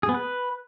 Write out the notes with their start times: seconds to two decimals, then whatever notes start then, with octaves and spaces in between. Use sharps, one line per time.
0.03 G#4
0.09 B3
0.14 B4